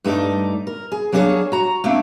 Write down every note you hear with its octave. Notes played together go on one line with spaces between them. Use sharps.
G2 A3 D#4 G#4 D5
A#4
G#4
F#3 A#3 D4 G4 G#4 C#5
F#4 A#5
A3 A#3 C4 D4